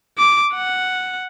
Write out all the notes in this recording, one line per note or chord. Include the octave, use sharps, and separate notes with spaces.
D6
F#5